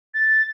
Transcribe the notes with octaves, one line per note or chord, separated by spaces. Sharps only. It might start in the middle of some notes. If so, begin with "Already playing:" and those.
A6